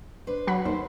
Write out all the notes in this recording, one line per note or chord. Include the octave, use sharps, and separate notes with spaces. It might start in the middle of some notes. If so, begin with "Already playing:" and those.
D4 B4 C5
F#3 B5
D#2 C5